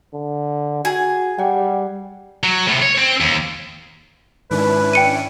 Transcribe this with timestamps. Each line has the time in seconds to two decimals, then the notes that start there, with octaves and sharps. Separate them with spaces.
0.13 D3
0.85 F#4 G#4
1.39 G3 F#5 G5
2.43 F#3
2.68 A2 C3
2.82 C#5
2.98 C4
3.21 D#2
4.51 G#2 D#3 C#4 D4 E4 B4
4.93 G5 C#7 D#7